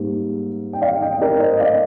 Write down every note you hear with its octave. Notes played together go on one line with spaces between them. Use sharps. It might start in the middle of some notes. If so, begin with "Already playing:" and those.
Already playing: G#2 G3 A#3
G5
D5 F5
D#5 G5
A#4 D5
C5 D#5
D5 F5